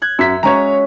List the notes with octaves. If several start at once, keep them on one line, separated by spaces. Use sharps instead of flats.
F#6 G#6
F#2 E5 B6
G#3 C#4 F#4 C#5 A#5